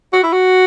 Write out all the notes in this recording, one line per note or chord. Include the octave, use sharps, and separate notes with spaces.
F#4
E4
F#4